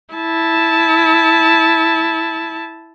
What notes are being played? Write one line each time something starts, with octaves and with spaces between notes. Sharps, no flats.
E4 A5